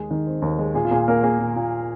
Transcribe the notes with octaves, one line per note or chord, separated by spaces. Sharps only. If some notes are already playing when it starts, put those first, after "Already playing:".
Already playing: D#2 G#3 G#4
D#3
C4
D#2
G#3
A#2 G#4
F4
A#2 G#4
A#3 A#4
A#3 G#4
A#2
A#2